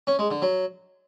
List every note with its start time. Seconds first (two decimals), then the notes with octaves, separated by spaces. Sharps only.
0.07 C#4
0.19 G#3
0.30 D3
0.42 F#3